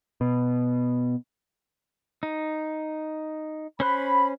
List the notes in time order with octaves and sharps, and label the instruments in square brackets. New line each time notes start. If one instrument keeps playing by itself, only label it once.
[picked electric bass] B2
[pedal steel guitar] D#4
[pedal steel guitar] C#4 C5 F#6 [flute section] B5